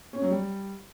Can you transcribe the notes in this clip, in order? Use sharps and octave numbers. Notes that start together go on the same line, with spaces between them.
C#4
F#3
G3